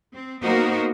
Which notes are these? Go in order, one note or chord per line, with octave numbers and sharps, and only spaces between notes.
C4
A#3 B3 D#4 F#4 A#4 C5